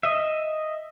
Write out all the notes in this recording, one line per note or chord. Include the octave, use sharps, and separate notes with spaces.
D#5 E5